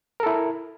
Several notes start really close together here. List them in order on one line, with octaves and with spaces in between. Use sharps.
A#4 A4 E4